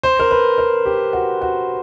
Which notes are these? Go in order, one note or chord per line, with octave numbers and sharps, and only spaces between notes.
C5
A#4
B4
A#4
G4
F#4
F#4